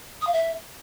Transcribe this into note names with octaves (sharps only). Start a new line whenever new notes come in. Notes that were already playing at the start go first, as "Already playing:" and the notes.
D#6
F5
E5